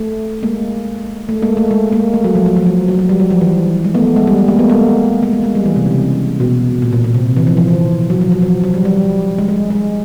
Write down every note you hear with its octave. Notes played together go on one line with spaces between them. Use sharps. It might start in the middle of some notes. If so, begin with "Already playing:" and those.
Already playing: A3
G#3 A#3
A3
G#3 A#3
A3
G#3
G#3 A#3
A3
F#3
F3
F#3
F3
F#3
F#3
F#3
G3
F#3
F3
E3
G#3
A3 B3
G#3
G3
G#3
G#3 A#3
A3 B3
G#3 A#3
G#3 A#3
G#3
G#3
G3
E3
C3
C#3
B2
A#2
A#2
A#2
C3
E3
F3
F3
E3
F#3
F3
F#3
F3
F#3
G3
G3
G#3
G#3
G#3